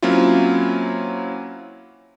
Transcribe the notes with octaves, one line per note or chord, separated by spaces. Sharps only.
F#3 A#3 C4 C#4 E4 F4